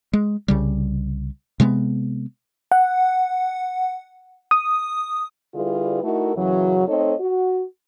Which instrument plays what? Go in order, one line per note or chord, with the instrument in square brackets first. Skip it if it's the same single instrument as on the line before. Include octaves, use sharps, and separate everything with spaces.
[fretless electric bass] G#3
C2 C#3 G3
C3 G#3 A3 B3
[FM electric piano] F#5
D#6
[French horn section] D3 G3 E4 F4 G#4 B4
A3 D#4 E4 F#4 A4 A#4
F#2 C#3 E3 F#3
A3 C4 D#4 A4 C#5 D#5
F#4